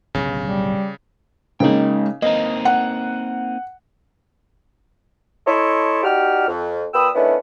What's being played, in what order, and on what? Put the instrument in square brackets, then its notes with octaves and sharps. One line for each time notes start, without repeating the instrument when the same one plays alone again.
[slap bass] D1 B1 G2 [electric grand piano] C#3
[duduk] G3
[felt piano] C#3 A#3 D#4 [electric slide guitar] G#3 G5
[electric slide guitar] A#3 C4 D#4 [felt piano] D#5
[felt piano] F#5
[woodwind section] E4 A4 C#5 D#5 A5 C6
D#4 F#4 G4 D5 F6
F2
A#2 B4 G5 B5 D#6 E6
D#3 A3 B3 C#4 D4 E4